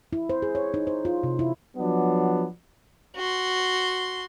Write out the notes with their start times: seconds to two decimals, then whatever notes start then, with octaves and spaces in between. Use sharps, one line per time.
0.13 E4
0.30 C5
0.42 G#4
0.55 C#5
0.74 D#4
0.87 C5
1.05 F4
1.24 C3
1.39 E4
1.77 F3 F#3 B3 D4
3.16 F#4 C6